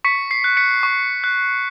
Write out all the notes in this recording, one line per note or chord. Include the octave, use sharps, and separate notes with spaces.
C#6 B6 C#7
C7
F#6
B6 C#7
C#6
F#6